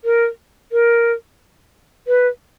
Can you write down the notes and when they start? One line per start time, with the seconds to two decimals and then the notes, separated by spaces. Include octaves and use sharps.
0.04 A#4
0.72 A#4
2.08 B4